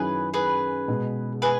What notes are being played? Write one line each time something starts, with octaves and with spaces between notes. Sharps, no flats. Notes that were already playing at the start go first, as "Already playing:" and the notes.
Already playing: F#2 D#3 F#3 C#4 E4 G#4 B4
G#4 B4
B2 G#3 B3
G#4 B4